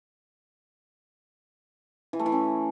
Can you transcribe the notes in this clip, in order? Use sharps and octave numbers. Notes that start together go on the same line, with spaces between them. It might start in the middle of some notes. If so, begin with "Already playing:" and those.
E3
A3
E3
C#4